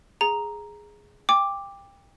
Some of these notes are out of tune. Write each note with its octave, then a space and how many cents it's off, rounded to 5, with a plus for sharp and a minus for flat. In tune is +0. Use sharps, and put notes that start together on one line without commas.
G#4 +0 A#5 +0
G5 +25 D6 +0